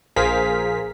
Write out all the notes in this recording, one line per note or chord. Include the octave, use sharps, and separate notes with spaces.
A#1 G#4 A#4 C5 F5 B6